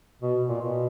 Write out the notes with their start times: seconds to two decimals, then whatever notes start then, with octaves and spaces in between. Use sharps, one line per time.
0.22 B2
0.48 A#2
0.62 B2